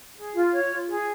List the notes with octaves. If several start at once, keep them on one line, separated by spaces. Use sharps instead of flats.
G#4
F4
C#5
F4
G#4